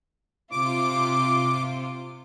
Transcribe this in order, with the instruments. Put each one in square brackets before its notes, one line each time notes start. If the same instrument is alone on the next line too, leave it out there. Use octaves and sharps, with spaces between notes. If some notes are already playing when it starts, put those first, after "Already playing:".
[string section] C3 F4 [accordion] D6